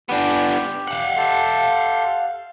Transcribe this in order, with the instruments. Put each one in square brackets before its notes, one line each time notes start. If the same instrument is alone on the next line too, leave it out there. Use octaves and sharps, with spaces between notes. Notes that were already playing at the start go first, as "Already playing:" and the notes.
[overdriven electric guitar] B3 D4 [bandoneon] G4
[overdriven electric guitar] F5 F#5
[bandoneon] G4 A4 C6